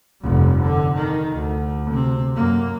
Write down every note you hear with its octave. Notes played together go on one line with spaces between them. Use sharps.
F1 G2
D3
D#3
D2
C3 C4
F#2 A#3